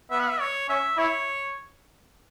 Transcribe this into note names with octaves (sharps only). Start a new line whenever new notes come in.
B3 E5
F#5
E5
C#5
C#4 E5
E4 C#5